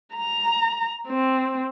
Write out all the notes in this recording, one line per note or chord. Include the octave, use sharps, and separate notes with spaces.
A#5
C4